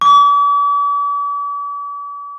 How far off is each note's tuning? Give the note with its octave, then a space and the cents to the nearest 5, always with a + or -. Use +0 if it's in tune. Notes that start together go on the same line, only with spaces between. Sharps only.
D6 -45